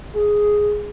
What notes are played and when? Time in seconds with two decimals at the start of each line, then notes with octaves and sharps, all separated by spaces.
0.15 G#4